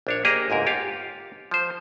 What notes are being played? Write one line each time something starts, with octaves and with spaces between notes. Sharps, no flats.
A#1 D4 C#5
A#3 G4 G#4 D#5 A#5
G1 C#2 G#2 A#4
F4 G4 C#5 F5
F3 C5